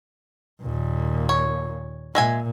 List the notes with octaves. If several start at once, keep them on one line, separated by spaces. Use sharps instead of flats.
D#2 A#2
C#5
A#2 G#3 E5 G#5